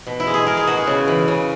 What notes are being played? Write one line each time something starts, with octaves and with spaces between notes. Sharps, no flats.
B2
E4
G#3
G#4
G#3 A#4
G#4
B2 F#4
G#4
C#3
E3
C#3